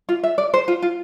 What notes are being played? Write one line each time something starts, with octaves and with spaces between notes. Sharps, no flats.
F4
E5
D5
C5
F4
F4